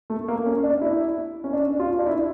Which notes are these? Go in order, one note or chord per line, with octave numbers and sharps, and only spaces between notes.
A3
A#3
C#4
D4
E4
C#4
D4
F4
D4
E4